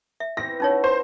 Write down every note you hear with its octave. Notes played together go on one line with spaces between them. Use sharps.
E5
E3 C4 A#6
B3 C#4 D#4 F#4 A4 C#5
C5